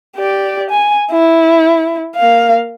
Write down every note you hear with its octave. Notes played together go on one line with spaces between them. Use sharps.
G4 D5
G#5
E4
A#3 F5